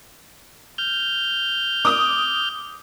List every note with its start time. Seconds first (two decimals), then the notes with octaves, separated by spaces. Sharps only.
0.78 F6 G6
1.85 D6 D#6